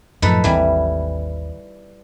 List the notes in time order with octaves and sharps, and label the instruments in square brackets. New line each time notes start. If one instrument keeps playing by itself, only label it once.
[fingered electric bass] F#2 A2 F3 [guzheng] D#4 A4 B4
[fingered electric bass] G#1 D#2 C4 [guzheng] E3 G3